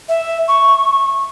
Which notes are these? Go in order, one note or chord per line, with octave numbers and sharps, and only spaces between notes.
E5
C#6